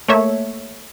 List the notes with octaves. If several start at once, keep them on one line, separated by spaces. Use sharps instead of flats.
A3 A#3 C#5 E5